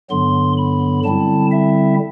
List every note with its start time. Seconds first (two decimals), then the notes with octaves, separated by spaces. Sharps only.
0.10 G2 D3 F#3 B3 C6
0.57 B5
1.04 D3 G3 C4 E4 A5
1.51 E5